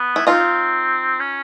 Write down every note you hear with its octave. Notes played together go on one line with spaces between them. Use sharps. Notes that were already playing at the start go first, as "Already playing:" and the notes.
Already playing: B3
E4
C4 D#4 F4
C#4